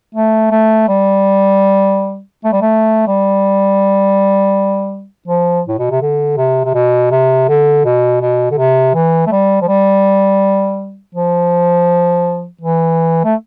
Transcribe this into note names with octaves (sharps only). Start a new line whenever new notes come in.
A3
A3
G3
A3
G3
A3
G3
F3
A2
B2
C3
D3
C3
C3
B2
C3
D3
B2
B2
D3
C3
E3
A3
G3
F3
G3
F3
E3
A3